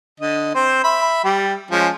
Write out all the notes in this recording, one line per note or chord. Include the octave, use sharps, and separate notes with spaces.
D3 D#5
C4 C5
E5 B5
G3 G4
F3 G#3 C#4